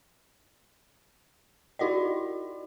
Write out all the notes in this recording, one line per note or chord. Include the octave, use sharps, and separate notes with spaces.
D#4 E4 F#4 D5 D#5